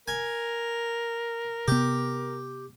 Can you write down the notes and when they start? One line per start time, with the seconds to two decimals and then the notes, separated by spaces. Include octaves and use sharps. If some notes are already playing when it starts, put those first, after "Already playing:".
0.08 A#4 G#5
1.68 C3 B3 G4